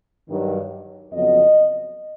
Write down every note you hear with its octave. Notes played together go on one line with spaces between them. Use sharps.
G2 D#3 F#3
F2 C#3 F#3 B3 D#5